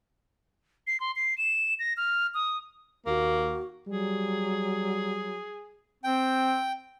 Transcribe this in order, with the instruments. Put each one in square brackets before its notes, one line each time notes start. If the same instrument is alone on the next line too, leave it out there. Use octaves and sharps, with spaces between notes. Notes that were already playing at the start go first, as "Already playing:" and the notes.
[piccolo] C7
C6
C7
E7
A#6
F6
D#6
[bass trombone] D#2 [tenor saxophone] A#3 [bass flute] F#4
[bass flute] F#3 [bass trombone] G3 [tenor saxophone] G#4
[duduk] C4 [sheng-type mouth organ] G5